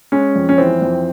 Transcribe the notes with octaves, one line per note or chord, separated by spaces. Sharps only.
G#3 C#4
F2
C#4
E3 C4
F2